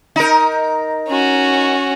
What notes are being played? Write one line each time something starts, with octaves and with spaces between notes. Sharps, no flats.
D#4 A#4
C#4 F#4